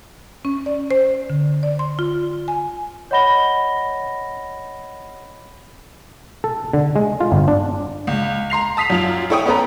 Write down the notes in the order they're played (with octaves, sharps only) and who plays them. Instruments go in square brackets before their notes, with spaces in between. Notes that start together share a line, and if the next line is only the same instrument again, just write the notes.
[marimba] C#4
D5
C5
D3
D5
C6
F4
G#5
[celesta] C#5 D#5 F#5 B5 A#6 G7
[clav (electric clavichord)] A4
D3
G#3
F4
G1
D4
[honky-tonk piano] C#2
A#5 C6 C7 F7
A5 D#6 B6 C7 F7
F#2 F4 F7
E4 A4 C#5 G5 D#6
B3 C#4 A4 B4 A#5